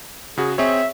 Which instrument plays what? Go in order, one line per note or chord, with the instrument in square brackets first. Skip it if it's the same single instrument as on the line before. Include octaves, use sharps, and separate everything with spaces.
[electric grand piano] C#3 F#4 [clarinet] G#4
[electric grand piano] C4 G#4 C#5 [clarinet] E5